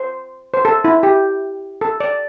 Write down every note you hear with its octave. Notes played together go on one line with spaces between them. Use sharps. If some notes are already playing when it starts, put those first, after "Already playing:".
Already playing: C5
C5
A4
E4
G4
A4
D5